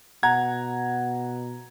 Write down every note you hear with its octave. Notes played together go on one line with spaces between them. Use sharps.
B2 F#5 A#5 G#6